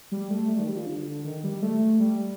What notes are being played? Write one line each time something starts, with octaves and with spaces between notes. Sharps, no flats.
G3
A3
G3
D#3
G3
F3
D3
D#3
G3
A3
G3